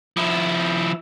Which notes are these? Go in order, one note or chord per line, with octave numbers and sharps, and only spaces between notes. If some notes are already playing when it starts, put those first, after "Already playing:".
F3 E4